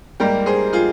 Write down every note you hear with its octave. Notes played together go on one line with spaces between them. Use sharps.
G#2 G3 A#3 G4 A#4
G#4 C5
F4 G#4